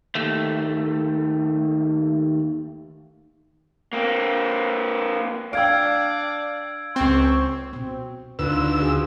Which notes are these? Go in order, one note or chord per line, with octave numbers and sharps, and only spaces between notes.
D#2 A3
A#3 C4
D4 D5 F5 G5 E6 G#6 D7
C#2 C4 C6 C#6
B2 C4
D2 D#4 F4 B4 E6
F4 F#4 G#4